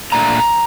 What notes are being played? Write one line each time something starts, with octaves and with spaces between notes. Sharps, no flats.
A#2 A3 D4 A#5